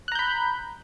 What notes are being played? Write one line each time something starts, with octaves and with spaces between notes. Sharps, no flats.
A#5 B5 F#6 G6